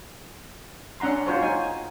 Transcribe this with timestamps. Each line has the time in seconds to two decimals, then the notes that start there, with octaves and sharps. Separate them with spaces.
1.00 C#4 D4 F#5 A#5 C6
1.27 F4 F#4 C5 C#5
1.41 D#4 G#5